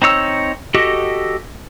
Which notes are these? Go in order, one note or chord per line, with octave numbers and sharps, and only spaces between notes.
C4 D#4 C#5 E6
F#4 G4 A4 D#5